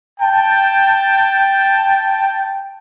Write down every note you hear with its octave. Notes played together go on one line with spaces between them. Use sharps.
G5 A5